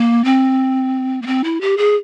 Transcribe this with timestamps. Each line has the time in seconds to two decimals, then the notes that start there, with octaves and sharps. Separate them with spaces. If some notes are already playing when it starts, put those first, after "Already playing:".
Already playing: A#3
0.25 C4
1.22 A#3
1.27 C4
1.44 E4
1.61 G4
1.78 G#4